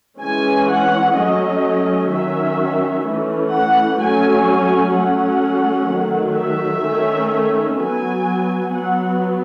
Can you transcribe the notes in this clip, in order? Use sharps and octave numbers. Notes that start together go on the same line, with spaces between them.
E3 G#3 C#4 G#5
F#5
F#3 A3 C#4 D#5
D#3 F#3 C#4 E5
E3 A3 C#4
F#5
F#3 A3 C#4 G#5
G#5
F#3 A3 C#4 F#5
D#3 F#3 A3
E5
D#3 A3 C#4
F#3 B3 G#5
F#3 B3 F#5